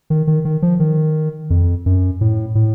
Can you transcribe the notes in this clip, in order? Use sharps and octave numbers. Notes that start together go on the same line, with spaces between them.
D#3
D#3
D#3
F3
D#3
F2
F#2
A2
A2